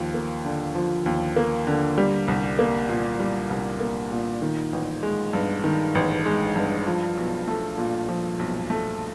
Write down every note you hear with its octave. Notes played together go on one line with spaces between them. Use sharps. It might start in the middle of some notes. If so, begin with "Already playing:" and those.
Already playing: D#2 F3
A#3
D3
F3
D#2
A#3
D3
G3
C2
A#3
A#2
G3
C2
A#3
A#2
D#3
A1
G#3
G2
D#3
A1
G#3
G2
F3
B1
A3
A#2
F3
B1
A3